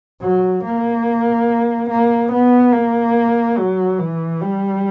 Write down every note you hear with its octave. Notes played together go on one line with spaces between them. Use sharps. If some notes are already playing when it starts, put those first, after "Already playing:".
F#3
A#3
A#3
B3
A#3
F#3
E3
G3